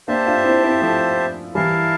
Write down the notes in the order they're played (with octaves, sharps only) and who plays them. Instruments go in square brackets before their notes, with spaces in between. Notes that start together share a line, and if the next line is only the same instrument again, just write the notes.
[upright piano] A#3 D4 [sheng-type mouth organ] G4 C5 E5 A5
[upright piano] D4 F4
C4 E4
C4 E4
F3 A3
[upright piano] E3 G3 [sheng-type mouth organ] E4 A#4 F5 A5